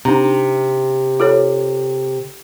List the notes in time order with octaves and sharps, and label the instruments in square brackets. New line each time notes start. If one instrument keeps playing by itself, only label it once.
[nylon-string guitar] C3 [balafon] D4 D#4 A#5
[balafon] F4 A4 C#5